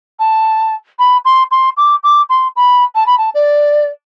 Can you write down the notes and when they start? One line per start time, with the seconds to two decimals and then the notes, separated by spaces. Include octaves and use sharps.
0.19 A5
0.99 B5
1.25 C6
1.51 C6
1.77 D6
2.03 D6
2.29 C6
2.56 B5
2.95 A5
3.06 B5
3.17 A5
3.34 D5